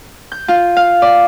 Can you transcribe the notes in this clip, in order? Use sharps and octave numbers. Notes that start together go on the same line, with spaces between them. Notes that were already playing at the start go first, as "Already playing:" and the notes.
G6
F4
F5
D5